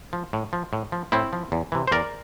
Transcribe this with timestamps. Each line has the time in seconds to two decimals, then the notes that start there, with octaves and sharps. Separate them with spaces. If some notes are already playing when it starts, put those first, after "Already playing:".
0.13 F3
0.33 A2
0.53 F3
0.73 A2
0.92 F3
1.12 A2 C4 E4
1.33 F3
1.52 E2
1.72 C3 E3
1.87 C5
1.92 E2 A#4 D5